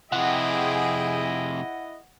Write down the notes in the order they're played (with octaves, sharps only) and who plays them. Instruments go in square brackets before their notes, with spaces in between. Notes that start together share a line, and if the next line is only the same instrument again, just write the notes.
[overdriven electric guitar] F2 C3 [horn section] E4 D#5 [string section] G#4 G5 [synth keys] F#5